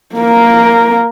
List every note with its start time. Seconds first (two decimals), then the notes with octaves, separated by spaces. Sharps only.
0.16 A#3 A#4